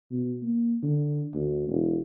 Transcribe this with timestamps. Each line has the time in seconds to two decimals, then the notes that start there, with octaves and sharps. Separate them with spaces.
0.12 B2
0.43 A#3
0.83 D3
1.34 D2
1.69 E1